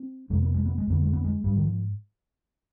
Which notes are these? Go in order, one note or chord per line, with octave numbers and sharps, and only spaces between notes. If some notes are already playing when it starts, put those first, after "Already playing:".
Already playing: C4
F2 C3 G#3
B3
G#3
B3
G#3
F2 D3 B3
G#3
B3
G#3
G#2 G3
D#3
F3